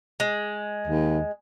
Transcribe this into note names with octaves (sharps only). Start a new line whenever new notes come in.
G#3
D#2